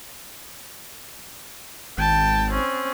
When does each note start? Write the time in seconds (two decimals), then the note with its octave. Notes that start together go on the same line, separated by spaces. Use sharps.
1.98 G#1 G5 A5
2.52 C4 C#4